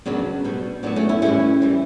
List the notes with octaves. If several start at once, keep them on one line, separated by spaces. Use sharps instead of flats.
F#2 C#3 F#3 B3 D4
B2 G3
A2 F#3 B3 D4
A3 C#4
C#4 E4
A2 E3 G3 C#4 E4
E3 G3